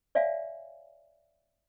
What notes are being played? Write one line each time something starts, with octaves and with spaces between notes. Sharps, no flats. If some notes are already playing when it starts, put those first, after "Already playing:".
C#5 D5 E5 F5 G#5